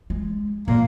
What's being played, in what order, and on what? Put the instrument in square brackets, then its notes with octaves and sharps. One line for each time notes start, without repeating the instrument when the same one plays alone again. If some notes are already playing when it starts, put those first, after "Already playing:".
[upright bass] G#3
[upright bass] A#2 [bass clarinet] A#3